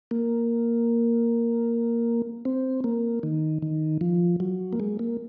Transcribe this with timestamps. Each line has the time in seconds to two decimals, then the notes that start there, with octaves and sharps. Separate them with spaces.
0.11 A#3
2.45 C4
2.84 A#3
3.23 D#3
3.62 D#3
4.01 F3
4.40 F#3
4.73 A#3
4.80 G#3
4.99 A#3